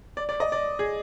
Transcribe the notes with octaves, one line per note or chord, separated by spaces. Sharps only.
D5
D5
D#5
D5
G#4